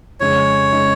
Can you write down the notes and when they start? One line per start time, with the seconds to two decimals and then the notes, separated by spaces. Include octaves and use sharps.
0.20 F2 C#3 G#3 D#4 C#5
0.72 C#3 G#3 D#4